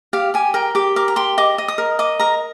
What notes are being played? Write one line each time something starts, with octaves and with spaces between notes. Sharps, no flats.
G4 F5
G4 G#5
A#4 G5
G4 D6
A#4 D6
A#5
G4 C6
D#5 D6
D#5
D#6
A#4
D#5 D6
A#4 A#5